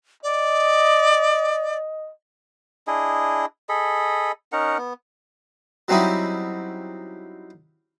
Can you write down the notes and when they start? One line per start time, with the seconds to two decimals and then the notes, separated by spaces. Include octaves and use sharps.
0.23 D5 D#5
2.87 D4 E4 G#4 D#5
3.69 G#4 A4 D#5 B5
4.52 C#4 D#4 A#4 F#5
4.78 B3
5.88 F#3 G3 C4 C#4 D#4 E4